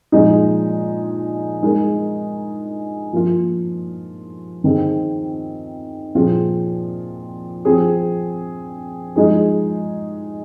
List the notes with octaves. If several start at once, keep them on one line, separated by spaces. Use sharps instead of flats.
A#2 F3 G#3 D#4
G#3 D#4 A#4
F3 A#3 F4
D#3 C4 G#4
A#2 F3 C4 F4 G#4
F3 C4 G#4
F3 G#3 D#4 G#4